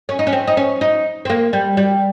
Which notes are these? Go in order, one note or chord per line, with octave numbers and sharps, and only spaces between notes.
C#4
D#4
C#4
C4
D#4
C#4
D#4
C4
A#3
G3
G3